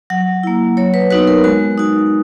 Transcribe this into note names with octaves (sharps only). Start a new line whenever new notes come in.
F#3 F#5
A#3 E4
F#3 C#5
B4
B3 D#4 F#4 B4
A#4
G#3 F#4
D#4 F#4